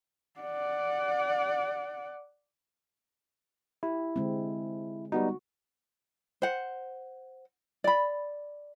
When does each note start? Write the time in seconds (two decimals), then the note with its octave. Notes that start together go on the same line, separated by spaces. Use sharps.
0.40 D5 F#5
3.83 E4 G4
4.16 D3 G#3 C4
5.12 G3 B3 D#4 F#4
6.42 C5 F#5
7.84 D5 B5